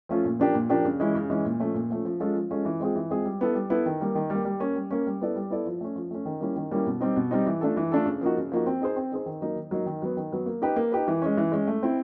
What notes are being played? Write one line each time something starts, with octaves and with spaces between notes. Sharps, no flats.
F3 A3 C#4 F4
A#2
F3 A#3 D4 G4
A#2
F3 A#3 D4 G4
C#3
E3 G#3 C#4 E4
C#3
E3 G#3 C#4 E4
A#2
F3 A3 C#4
A#2
F3 A3 C#4
F3
G#3 C#4 F4 A4
F3
G#3 C#4 F4 A4
E3
G#3 C4 F4 G#4
E3
G#3 C4 F4 G#4
G3
B3 E4 A4
G3
B3 E4 A4
D#3
G3 A#3
D#3
G3
A#3
G3
A#3 C#4
G3
A#3 C#4
G3
B3 E4 A4 D5
G3
B3 E4 A4 D5
F3
A3 C#4
F3
A3 C#4
D#3
G3 A#3 C#4 E4
D#3
G3 A#3 C#4 E4
B2
G3 C4 D#4
B2
G3 C4 D#4
E3
A3 D4 F4 A4
E3
A3 D4 F4 A4
C#3
F3 A#3 D#4 F#4
C#3
F3 A#3 D#4 F#4
C4
D#4 G#4 C5
C4
D#4 G#4 C5
D#3
F#3 A#3 D#4
D#3
F#3 A#3 D#4
D#3
F#3 B3
D#3
F#3 B3
A#3
D#4 G4 B4
A#3
D#4 G4 B4
E3
G#3 C#4
E3
G#3 C#4
A3
C4 E4